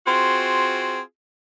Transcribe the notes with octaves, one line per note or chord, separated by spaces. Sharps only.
C4 F4 F#4 G#4